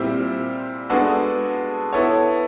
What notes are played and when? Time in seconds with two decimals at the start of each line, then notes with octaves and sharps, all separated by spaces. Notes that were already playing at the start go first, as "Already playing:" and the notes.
Already playing: A#2 G3 C4 E4 G4
0.89 G#3 B3 D4 F#4 A4
1.93 B3 E4 A4 C#5